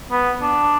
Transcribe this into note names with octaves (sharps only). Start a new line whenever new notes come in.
B3
D4